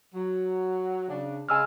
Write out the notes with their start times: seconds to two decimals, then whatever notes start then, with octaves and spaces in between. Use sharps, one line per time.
0.14 F#3
1.09 C#3 D4
1.49 C#3 G#3 G#5 E6 F6